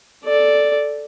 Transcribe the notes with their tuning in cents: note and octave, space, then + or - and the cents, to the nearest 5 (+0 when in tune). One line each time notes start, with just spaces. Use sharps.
A4 +0 D5 +0